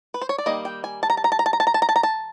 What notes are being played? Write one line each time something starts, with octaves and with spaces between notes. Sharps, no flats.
B4
C5
C#5
D5
D#3 G3 A#3 D#5
G5
G#5
A5
A#5
A5
A#5
A5
A#5
A5
A#5
A5
A#5
A5
A#5
A5
A#5
A5